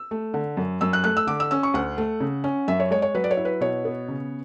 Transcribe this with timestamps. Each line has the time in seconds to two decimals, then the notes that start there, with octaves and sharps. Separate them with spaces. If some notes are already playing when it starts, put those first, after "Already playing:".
Already playing: E6
0.11 A3
0.34 D3
0.57 F#2
0.81 F#2 E6
0.93 F#6
1.04 A3 F#6
1.17 E6
1.27 D3 D6
1.40 E6
1.51 C#4 E6
1.63 C#6
1.74 D2 F#5
1.98 A3
2.21 C#3
2.44 C#4
2.68 F#2 E5
2.80 C#5
2.91 G#3 C#5
3.02 C#5
3.15 F#3 B4
3.24 D5
3.31 C#5
3.37 E4
3.45 B4
3.61 B2 C#5
3.85 B3
4.09 C#3